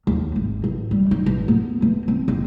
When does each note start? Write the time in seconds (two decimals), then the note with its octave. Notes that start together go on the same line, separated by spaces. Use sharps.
0.07 D#2
0.36 G#1
0.64 A1
0.91 G3
1.11 D#4
1.26 A1
1.48 B3
1.82 E3
2.08 C4
2.28 F#1